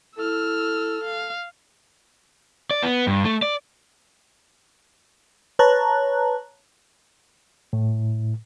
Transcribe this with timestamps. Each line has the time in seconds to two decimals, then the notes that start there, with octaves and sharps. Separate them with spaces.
0.18 E4 A4 E6 F6
1.04 F5
2.71 D5
2.83 B3
3.07 G2
3.25 A3
3.42 D5
5.59 B4 C#5 A5 A#5 F#6
7.73 A2